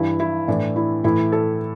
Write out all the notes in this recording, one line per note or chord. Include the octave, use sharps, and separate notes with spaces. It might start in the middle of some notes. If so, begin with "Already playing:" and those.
Already playing: G2 E3 E4
E4
A2 E3 D4
E4
A2 E3 E4
A4